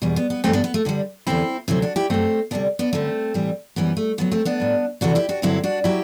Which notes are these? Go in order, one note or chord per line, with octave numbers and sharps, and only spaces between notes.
E2 B2 G3
B3
B3
G2 E3 G3 A3 C4
B3 D4
B3
A3
G2 D3 G3
E2 D3 G3 C4 E4
D2 C3 F#3 C4 E4
D4 F#4
E4 G4
F#2 F#3 A3 C4
D2 C3 G3 B3 D4
B3 D4
F#2 D3 G3 A3 C4
A2 E3 G3
F#2 E3 G3 B3
A3
D2 D3 F#3 B3
A3 C4
B3 D4
A2 G3
D2 C3 E3 D4 F#4
E4 G4
D4 F#4
G2 D3 F#3 C4 E4
D4 F#4
F#3 E4 G4